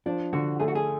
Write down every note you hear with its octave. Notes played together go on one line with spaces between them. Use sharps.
F3 D4
D3 F#4
A3 G#4
F#4
G#4